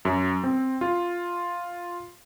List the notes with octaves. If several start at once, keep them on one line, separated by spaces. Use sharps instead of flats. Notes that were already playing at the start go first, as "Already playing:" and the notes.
F#2
C4
F4